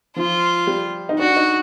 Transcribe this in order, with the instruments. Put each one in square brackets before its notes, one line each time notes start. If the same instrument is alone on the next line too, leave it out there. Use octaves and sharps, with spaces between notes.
[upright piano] F3 [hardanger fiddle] F4
[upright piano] G3
D#4
[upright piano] D4 [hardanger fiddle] F#4
[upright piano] D#4